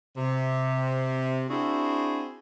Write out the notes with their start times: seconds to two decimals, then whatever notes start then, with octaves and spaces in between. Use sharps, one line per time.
0.17 C3
1.50 C4 D4 E4 F#4 G#4